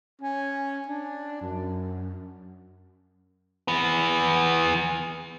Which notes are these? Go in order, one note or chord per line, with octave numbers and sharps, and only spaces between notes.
C#4
D4
F#2
E3 B3